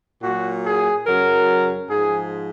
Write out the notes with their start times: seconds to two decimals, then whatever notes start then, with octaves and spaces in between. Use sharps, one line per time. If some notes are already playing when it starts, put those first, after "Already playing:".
0.23 A#2 F#3 F#4
0.65 G#4
1.06 F#2 C#3 F#3 A#4
1.90 G#2 F3 G#4